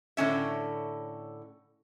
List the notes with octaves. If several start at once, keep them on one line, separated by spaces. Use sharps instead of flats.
A2 D3 C#4 E5